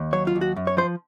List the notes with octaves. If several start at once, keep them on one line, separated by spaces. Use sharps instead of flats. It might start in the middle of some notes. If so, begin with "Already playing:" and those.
Already playing: D#2
F#3 C#5
F4
D#2
F#4
F#2
C#5
F3 C5